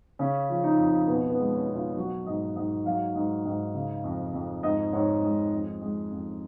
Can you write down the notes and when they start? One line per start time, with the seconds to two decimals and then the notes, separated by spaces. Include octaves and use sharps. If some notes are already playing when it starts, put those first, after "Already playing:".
0.19 C#3 C#4
0.49 F3
0.64 D#4
0.78 F2
1.08 B2 B3
1.30 B3
1.38 G#3
1.53 C#4
1.67 B2
1.75 F4
1.97 F#3 F#4
2.26 G#2 D#5
2.56 G#2 D#5
2.86 F#3 F5
3.15 G#2
3.45 G#2
3.74 C#3
4.04 F2
4.34 F2
4.63 G#2 D#5
4.93 G#2 C#5
5.22 G#3
5.52 F2
5.81 G#3
6.11 F2